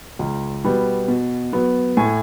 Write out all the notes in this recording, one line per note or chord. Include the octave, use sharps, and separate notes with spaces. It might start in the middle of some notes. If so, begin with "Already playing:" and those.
C#2
B2 G3 B3
B2
F#3 B3
A2 G#5